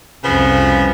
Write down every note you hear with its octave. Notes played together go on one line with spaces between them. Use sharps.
C2 F2 C#3 F3 B3